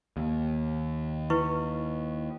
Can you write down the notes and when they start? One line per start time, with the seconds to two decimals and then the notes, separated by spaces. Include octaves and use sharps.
0.17 D#2
1.30 E4 B4 C#6